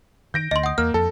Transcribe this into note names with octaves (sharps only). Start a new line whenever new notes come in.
D#3 G6 A#6 D7
D2 D#5 C6
F#5 D#6
E2 A#3 F6
F2 A4